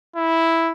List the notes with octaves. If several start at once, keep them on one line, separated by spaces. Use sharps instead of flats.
E4